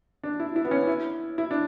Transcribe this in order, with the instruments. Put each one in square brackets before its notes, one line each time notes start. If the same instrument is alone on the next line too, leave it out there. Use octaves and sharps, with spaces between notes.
[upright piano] D4
E4
E4
B3
C#4
E4
E4
D4